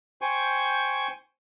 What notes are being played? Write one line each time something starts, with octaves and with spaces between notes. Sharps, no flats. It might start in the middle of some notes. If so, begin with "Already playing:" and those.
C5 G5 G#5 C#6